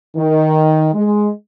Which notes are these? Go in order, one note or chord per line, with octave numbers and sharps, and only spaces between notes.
D#3
G#3